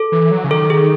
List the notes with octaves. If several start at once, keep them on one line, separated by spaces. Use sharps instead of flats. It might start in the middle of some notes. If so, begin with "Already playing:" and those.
Already playing: A4
E3
F#3
C#3
D#3 A4
G#4